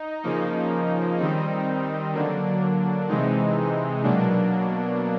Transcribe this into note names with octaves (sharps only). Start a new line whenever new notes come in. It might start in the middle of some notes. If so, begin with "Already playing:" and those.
Already playing: D#4
C#3 F3 A#3 D#4
D#3 G3 C4 D#4
D3 F#3 A#3 D4
C3 E3 G#3 C4 D#4
B2 F#3 A#3 D4